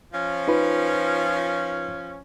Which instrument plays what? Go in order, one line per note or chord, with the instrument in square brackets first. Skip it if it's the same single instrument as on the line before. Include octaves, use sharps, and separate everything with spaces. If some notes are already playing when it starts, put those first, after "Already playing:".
[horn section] F3 C#4
[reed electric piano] D#4 F4 B4